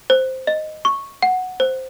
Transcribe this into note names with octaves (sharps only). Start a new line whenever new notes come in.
C5
D#5
C#6
F#5
C5